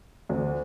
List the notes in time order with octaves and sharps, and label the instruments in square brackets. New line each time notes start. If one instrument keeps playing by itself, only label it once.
[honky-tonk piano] D2